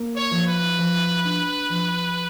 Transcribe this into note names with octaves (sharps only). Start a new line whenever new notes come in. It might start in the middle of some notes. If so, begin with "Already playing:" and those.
Already playing: A#3
C#5
F3
B4
F3
D4
F3